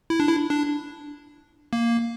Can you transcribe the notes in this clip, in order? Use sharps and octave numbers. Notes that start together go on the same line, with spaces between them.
E4
D4
E4
D4
A#3